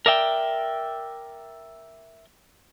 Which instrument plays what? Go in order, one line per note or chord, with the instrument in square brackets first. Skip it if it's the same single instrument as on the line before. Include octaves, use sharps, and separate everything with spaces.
[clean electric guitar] A#4 D5 E5 G5